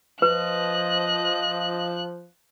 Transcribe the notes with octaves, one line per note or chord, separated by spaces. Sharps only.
F3 B4 D#5 F#6